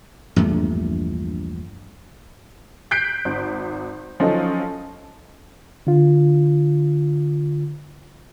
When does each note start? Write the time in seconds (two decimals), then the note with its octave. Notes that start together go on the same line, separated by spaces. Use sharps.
0.36 A#1 E2 G2 A3
2.91 F#6 G6 B6 C7 D7
3.25 G#1
4.20 F3 F#3 C#4 D#4 A4
5.87 D3 F4